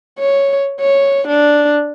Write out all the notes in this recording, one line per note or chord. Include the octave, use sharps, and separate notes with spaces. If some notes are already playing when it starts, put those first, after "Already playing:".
C#5
C#5
D4